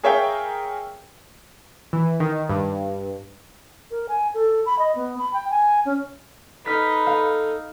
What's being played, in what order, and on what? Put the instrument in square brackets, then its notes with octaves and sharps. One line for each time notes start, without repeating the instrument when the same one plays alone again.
[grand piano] G#4 A#4 C#5 E5 F5 G5
[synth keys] E3
D#3
G2
[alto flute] A#4
G#5
A4
B5
D#5
B3
B5
G5
G#5
C#4
[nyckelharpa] D#4 [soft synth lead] A4 [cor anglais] B4 [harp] B5 F6 B6
[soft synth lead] A4 [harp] F5